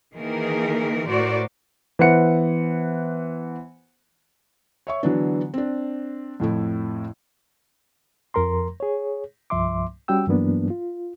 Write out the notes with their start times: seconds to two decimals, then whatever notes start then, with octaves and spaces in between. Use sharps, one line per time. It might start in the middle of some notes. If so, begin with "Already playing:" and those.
0.14 D#3 E3 A#3 G#4 A#4
1.08 A2 F#4 A#4 C5 D5
1.99 E3 B3 C5 F#5 C#7
4.87 C#5 E5 C#6
5.03 D3 E3 F#3 B3 D4
5.54 C4 D4
6.40 F2 A2 A3 E4
8.34 F2 F3 A#4 A#5 C6
8.80 G#4 C#5
9.50 C2 G2 F3 E5 C6 D6
10.08 G3 C#4 F#4 G5 E6
10.27 G2 E3 F#3 A#3 B3 D4
10.70 F4